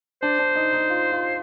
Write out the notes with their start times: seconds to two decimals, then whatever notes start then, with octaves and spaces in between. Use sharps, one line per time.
0.22 D4 C5
0.39 D4
0.56 D#4
0.73 D#4
0.90 F4
1.12 F4